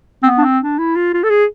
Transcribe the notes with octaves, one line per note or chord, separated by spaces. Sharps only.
C4
B3
D4
C4
D4
E4
F4
F4
A4
G#4